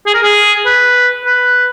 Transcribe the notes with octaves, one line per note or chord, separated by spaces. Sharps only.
G#4
A#4
G#4
B4
B4